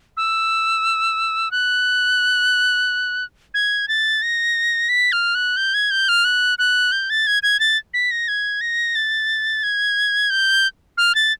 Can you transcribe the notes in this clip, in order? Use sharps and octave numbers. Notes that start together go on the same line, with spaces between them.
E6
F#6
G#6
A6
A#6
B6
F6
F#6
G6
G#6
G6
F6
F#6
F#6
G6
A6
G#6
G#6
A6
B6
A#6
G#6
A#6
A6
G#6
G6
F6
A6